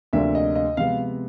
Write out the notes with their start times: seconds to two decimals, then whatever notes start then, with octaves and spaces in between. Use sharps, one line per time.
0.13 D2 C3 F3 A#3 D4 E5
0.35 D#5
0.56 D#5
0.77 C3 F3 G#3 B3 F5